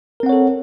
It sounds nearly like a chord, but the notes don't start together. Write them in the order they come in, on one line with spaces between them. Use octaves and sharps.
A#4 C4 F#5 C#5 A4